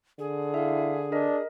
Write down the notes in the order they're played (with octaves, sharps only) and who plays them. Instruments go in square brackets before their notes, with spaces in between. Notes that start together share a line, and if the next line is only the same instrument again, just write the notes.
[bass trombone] D3 [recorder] G#4
[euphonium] E4 [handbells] E5 F5
[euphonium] D4 [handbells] A#4 D#5